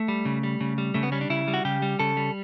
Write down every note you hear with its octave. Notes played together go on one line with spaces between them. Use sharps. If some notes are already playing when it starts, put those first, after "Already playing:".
Already playing: A3
G3
C#3
G3
C#3
G3
C#3 A3
B3
G3 C#4
D4
C#3 E4
G3
F#4
C#3 G4
G3
C#3 A4
G3